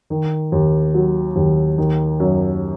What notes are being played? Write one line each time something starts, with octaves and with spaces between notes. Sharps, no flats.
D#3
D#2
F#3
D#2
D#3
F#2